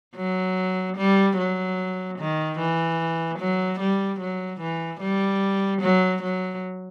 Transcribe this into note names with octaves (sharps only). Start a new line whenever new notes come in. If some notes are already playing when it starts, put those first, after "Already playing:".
F#3
G3
F#3
D#3
E3
F#3
G3
F#3
E3
G3
F#3
F#3